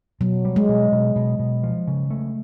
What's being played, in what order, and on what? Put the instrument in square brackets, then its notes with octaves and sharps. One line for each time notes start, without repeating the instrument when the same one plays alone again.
[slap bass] B2 [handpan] F#3
[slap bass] G3
[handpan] G#3
[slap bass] B2
B2
B2
B2
F3
C#3
A3